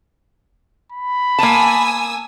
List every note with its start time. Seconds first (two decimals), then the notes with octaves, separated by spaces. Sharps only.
0.92 B5
1.39 A#3 G#5 A5 D#6 E6